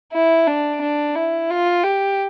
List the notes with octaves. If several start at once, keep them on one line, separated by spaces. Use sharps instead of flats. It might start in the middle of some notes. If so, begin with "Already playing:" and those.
E4
D4
D4
E4
F4
G4